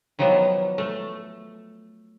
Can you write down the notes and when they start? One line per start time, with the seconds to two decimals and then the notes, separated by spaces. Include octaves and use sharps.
0.19 D#3 F3 F#3 A#3 B3
0.78 A3